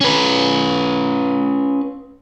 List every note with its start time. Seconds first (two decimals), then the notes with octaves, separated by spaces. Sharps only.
0.01 C#4 B4